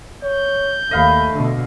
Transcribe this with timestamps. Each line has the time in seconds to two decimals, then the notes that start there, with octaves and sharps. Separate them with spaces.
0.23 C#5 G6
0.91 D#2 A3 D#5 F5 B5
1.34 B2 D3